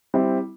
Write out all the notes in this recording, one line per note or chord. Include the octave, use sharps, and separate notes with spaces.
G3 C4 E4